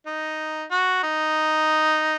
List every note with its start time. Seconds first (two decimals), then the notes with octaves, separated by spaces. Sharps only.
0.06 D#4
0.71 F#4
1.03 D#4